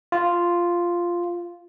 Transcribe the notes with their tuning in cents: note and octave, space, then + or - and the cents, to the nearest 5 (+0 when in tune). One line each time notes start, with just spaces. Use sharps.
F4 -5